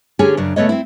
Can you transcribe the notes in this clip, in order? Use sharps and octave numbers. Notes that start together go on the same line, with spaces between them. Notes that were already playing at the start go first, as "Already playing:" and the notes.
D3 C#4 G4 G#4 C#5 G#5
F#2 C#3 D4
C#3 A3 B3 C#5 D#5
C4 E4